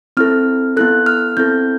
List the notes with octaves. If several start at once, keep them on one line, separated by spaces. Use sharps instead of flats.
C4 E4 A4 F6
B3 E4 A4 F#6
F6
C4 E4 A4 G6